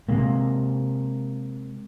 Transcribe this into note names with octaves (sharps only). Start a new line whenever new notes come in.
C3 G#3 A#3